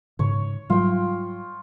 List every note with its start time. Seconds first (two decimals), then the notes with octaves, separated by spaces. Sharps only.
0.19 G#2 C#3 C#5
0.70 G#2 F#3 G3 F4 G5